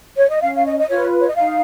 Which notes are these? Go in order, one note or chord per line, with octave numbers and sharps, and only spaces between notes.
C#5
D#5
C#4 F5
F5
D#5
D#5
F4 B4 C#5
C#5
D#5
D#4 F5